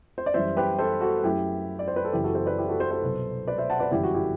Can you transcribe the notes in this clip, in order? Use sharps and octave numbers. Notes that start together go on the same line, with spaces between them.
C5
D5
F#2 E3 G3 C5 E5
G4 B4
A4 C5
F#4 A4
F#2 F#3 A3 E4 G4
D5
C5
B4
A4
F#1 F#2 E3 E4 G4
F#4 A4
A4 C5
B4 D5
E4 G4
F#4 A4
A4 C5
A4 C5
C2 B2 F#3
B4 D5
C5 E5
F#5 A5
B4 D5
G1 F#2 E3 G3 E4 G4
F#4
E4 G4